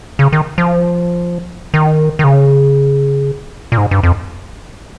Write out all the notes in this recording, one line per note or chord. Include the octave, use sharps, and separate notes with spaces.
C#3
D#3
F3
D#3
D#3
C#3
A#2
G#2
G2
F2